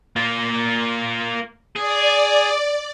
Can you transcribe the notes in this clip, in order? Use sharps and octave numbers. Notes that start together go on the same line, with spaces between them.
A#3 F4
G#4 D5